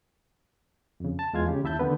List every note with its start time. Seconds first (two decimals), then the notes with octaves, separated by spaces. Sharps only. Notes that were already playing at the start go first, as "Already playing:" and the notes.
1.00 F2 C#3
1.19 A5
1.33 E2 G#3 F4 F5 G#6
1.48 C#3 G4
1.64 D#2 E4 E5 A5 G6
1.79 D3 D#3 B3 B4